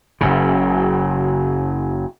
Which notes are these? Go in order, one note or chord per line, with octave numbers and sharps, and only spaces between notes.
F#1 F#2 C#3